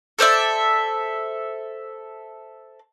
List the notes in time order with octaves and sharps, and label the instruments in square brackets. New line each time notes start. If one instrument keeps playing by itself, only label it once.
[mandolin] A4 C5 D5 E5